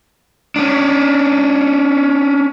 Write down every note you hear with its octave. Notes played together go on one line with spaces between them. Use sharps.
C#4 D4